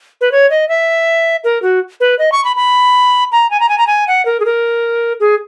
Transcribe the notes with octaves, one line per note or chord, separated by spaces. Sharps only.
B4
C#5
D#5
E5
A#4
F#4
B4
D#5
C#6
B5
B5
A#5
G#5
A#5
G#5
A#5
G#5
F#5
A#4
G#4
A#4
G#4